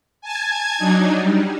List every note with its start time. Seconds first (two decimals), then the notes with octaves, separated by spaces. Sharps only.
0.21 G#5 A5 G#6
0.78 F#3 D4 D#4
1.20 G3